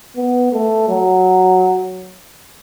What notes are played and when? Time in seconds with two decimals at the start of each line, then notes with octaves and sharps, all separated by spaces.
0.16 B3
0.52 A3
0.89 F#3